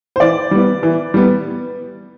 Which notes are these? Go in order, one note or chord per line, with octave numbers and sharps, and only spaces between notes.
C5
E3 D5
G3 B3
E3
G3 B3